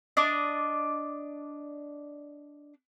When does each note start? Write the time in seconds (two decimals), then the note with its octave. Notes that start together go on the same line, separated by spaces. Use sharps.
0.17 D4 D5 D#5